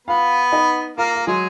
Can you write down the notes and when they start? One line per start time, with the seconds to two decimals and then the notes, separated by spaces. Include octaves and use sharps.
0.07 B3 F4 B4 F5
0.52 D#4 D#5
0.97 A#3 F4 A#4
1.15 F4
1.27 F#3 G#3 F#4 G#4